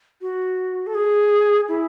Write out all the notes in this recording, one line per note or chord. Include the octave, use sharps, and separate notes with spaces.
F#4
A4
G#4
E4